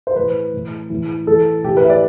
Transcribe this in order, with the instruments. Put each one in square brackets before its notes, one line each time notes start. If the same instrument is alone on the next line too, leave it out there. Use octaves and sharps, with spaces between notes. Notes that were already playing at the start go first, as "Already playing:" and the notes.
[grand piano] C5
A2 E3 B4
A2 E3
A2 E3
A2 E3 A4
A2 G4
E3
B4
E5
D5